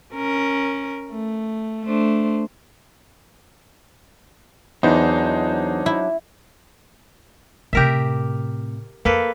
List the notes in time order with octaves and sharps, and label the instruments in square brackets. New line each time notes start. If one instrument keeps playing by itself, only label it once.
[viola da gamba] C#4 A#4
A3
A3 D4 C5
[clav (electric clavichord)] E2 [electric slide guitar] F#3 D4 [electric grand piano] D#4 C5
[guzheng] E4
[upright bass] A2 C3 [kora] G4 A#4 E5
[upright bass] F2 [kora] A#3 A4 B4